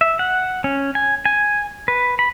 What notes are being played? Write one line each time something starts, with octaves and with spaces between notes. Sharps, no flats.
E5
F#5
C#4
G#5
G#5
B4
B5